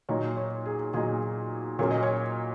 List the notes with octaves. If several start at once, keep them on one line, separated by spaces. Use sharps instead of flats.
A#2 F#3 D#4 C#5
C#5
G#4
A#2 F#3 D#4 G#4
A#2 F#3 A#3 C#4 C#5
D#5
C#5